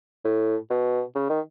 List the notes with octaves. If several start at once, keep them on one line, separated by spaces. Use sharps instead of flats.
A2
B2
C#3
D#3